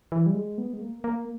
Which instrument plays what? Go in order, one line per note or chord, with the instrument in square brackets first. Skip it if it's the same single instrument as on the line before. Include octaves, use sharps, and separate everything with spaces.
[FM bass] E3
G3
G#3
B3
G#3
A#3
A#3